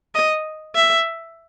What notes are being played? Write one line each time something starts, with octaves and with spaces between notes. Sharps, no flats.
D#5
E5